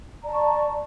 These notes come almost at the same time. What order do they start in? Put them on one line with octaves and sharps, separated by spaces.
A#5 D5 A5 C#6